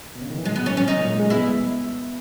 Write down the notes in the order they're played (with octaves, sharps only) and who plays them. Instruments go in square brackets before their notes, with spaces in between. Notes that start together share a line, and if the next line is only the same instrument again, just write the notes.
[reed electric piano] B2
C#3
D#3
E3
[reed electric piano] F#3 [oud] G#3
[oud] B3
[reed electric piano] E3 [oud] C#4
[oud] C#4
[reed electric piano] C#3 [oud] D#4
[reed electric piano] A#2
G#3
G#3
[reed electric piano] B3 [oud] E4